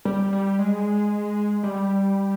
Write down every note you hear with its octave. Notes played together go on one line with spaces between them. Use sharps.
G3
G3
G#3
G3